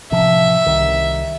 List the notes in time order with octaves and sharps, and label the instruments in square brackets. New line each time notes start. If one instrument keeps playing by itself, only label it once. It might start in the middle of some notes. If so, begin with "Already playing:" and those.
[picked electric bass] A1 C3 F3 [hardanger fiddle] E5
[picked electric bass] C2 D#3